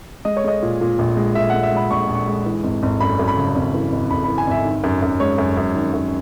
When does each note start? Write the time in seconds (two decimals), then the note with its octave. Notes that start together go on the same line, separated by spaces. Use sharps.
0.25 G#3 D#5
0.37 C#5
0.44 G#3 D#5
0.63 A#2
0.81 A#2
0.99 A#1
1.17 G#3
1.35 A#2 E5
1.50 F#5
1.54 G#3
1.63 E5
1.72 G#3 B5
1.91 A#1 C#6
2.08 A#1
2.15 C#6
2.28 G#3
2.46 E3
2.64 G#1
2.83 G#1
3.00 F#2 B5
3.19 F#2
3.28 B5
3.37 C#3
3.56 G#1
3.74 E3
3.92 G#1
4.10 G#1 B5
4.24 B5
4.28 E3
4.38 G#5
4.47 G#1 E5
4.65 D#3
4.84 F#2
5.02 F#2
5.20 G#3 C#5
5.38 F#2
5.57 F#2
5.75 D#3
5.94 F#2